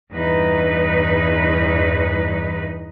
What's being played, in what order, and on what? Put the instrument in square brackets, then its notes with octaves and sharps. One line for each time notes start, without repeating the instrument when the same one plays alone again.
[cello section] E2 G2 D#4 B4